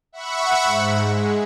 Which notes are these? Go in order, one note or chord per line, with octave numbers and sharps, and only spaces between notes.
E5 F#5 B5 C#6
G#2
G#3